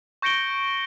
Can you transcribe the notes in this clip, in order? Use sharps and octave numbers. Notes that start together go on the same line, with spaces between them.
C#6 G6 A#6 C#7 D7 G7